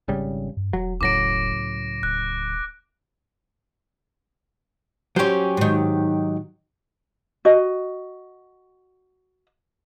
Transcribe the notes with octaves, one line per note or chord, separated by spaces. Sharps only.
G#1 C#3 G3
G2
E1 F#3
C#2 A2 F#3 D6 A#6 D7
D1 F#6
F#3 C#4 G4 C5
G#2 D#3
F#4 D#5